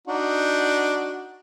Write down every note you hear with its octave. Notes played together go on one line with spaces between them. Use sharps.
D4 D#4 F#4